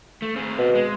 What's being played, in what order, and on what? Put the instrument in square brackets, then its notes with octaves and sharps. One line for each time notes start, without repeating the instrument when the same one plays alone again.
[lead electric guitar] A3
C4 G#4
[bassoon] B2
[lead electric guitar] G#3